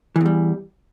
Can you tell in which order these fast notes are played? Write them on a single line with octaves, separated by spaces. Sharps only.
E3 E2 G3